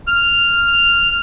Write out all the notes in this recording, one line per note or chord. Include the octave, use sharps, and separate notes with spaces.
F6